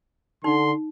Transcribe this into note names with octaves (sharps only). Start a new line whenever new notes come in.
D3 D#4 C6